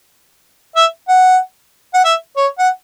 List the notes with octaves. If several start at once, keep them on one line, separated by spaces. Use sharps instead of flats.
E5
F#5
F#5
E5
C#5
F#5